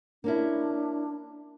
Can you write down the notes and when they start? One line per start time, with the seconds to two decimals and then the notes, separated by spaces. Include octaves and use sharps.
0.24 A#3 C#4 D4 E4